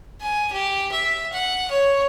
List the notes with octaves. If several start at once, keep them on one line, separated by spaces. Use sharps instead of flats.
G#5
G4
E5
F#5
C#5